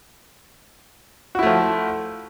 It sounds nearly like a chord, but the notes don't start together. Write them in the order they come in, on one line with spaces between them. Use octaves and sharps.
F#4 E4 A3 F3